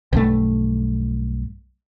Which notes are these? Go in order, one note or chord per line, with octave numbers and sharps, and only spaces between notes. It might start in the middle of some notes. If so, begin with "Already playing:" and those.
B1 G2 A3